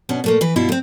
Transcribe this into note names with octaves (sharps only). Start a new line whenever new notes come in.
B2 C#4 D4
A#2 A3 A#3
E3 B4
G2 B2 E4 F4
A3 C4